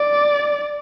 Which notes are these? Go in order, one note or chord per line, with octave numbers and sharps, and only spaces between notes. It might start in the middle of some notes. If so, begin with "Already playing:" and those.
Already playing: D5